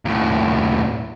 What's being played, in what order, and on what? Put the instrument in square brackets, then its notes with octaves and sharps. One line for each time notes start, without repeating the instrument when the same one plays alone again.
[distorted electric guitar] D#2 A2